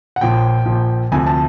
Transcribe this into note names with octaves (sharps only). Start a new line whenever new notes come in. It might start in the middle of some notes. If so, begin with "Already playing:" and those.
F#5
A#1 A#2 F3 G5
A#1 A#2 F3
D2 C3 F3 G#5
A5